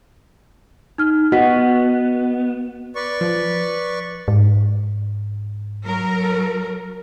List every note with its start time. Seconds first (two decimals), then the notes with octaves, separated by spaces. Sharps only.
0.98 D#4 F6
1.32 B3 F#4 D#5 B6
2.96 B4 D5 C#6
3.21 F3
4.28 G#2
5.85 F#3 A#4